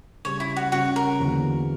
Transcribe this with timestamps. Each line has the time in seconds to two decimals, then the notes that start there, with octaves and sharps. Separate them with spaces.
0.25 C#3 G3 C#4 C#5
0.40 E4
0.56 F#4
0.72 C#3 G3 C#4 F#4
0.96 A#4
1.20 E2 D3 F#3 A#3